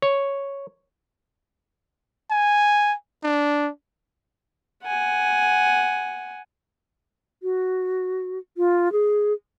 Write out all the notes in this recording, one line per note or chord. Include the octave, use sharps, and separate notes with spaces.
C#5
G#5
D4
F#5 G#5
F#4
F4
G#4